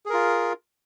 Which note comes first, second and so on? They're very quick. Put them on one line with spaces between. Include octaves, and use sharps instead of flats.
G#4 A#4 F4